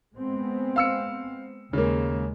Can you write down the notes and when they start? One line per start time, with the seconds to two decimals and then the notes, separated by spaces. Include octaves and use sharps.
0.16 G#3 B3 C4
0.76 F5 E6 C#7
1.73 D#2 C#3 G#3 A#3